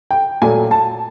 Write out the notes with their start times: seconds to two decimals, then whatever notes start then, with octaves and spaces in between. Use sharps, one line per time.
0.11 G5
0.42 A#2 F#3 A3 G#5
0.71 A5